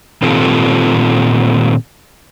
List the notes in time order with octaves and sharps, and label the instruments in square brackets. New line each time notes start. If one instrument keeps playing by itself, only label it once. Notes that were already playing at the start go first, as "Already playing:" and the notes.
[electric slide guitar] A#2 D#3 C4 F4 G4 A4